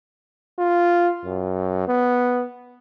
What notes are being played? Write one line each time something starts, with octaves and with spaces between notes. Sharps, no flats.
F4
F#2
B3